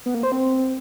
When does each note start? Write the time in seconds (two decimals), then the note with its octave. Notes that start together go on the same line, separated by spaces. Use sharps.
0.06 B3
0.15 A#3
0.23 C5
0.32 C4